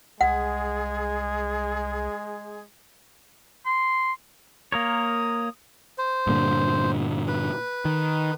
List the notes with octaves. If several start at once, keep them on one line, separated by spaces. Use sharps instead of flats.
C2 G#3 G#4 F#5
C6
A#3 A#4 C#5 D#6
C5
G2 A#2 D3
B4
D#3